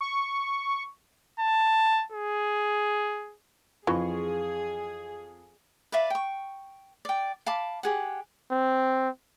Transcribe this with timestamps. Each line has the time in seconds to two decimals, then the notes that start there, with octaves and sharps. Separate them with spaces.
0.01 C#6
1.40 A5
2.12 G#4
3.87 F2 E3 F4 G#4 C#6
5.92 B4 D5 E5 F5
6.10 G5 C#6
7.05 D5 G5
7.46 F5 A5 B5 D6
7.83 G4 G#4 F#5
8.51 C4